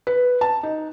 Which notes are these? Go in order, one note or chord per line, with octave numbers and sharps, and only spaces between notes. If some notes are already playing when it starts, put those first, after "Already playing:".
B4
A5
D#4